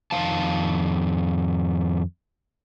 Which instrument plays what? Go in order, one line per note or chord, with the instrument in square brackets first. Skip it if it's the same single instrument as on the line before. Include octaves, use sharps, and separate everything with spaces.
[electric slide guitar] F2 D#3 C4 F5 A5